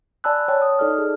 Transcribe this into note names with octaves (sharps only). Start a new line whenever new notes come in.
D5 G#5 A5 B5 E6 F#6
C#5 G5 A5
D#6
D#4 A4 D5 F6
G#4